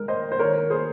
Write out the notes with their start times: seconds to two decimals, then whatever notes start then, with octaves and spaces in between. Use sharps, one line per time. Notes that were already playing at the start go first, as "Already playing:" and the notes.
Already playing: D#3 G#3 A#4
0.08 C5 D#5
0.32 C5
0.39 D#3 A#4 C#5
0.70 G#4 C5